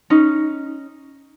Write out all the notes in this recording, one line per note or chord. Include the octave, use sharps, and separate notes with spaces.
C#4 D#4